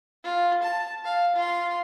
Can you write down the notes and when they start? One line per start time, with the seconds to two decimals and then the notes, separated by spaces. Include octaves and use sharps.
0.24 F4
0.62 A5
1.04 F5
1.35 F4 C6